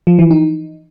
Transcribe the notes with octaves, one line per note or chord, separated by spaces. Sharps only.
F3
E3
D#4